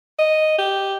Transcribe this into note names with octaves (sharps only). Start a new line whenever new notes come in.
D#5
G4